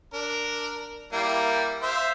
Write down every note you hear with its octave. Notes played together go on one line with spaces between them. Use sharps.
D4 A#4
G3 A#3 E4
C5 E5 F5